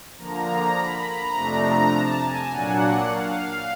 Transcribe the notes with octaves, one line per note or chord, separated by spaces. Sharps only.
D3 F3 A#3 A#5
B5
A#5
F2 C3 F3 A3 D4
A5
G#5
A#2 F#3 A#3 D4 F#5
F5